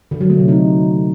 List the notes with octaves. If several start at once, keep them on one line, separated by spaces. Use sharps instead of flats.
D3
F#3
A3
C3
D#4